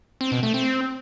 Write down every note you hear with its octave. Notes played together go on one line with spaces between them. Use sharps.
C4
B2
A3
C4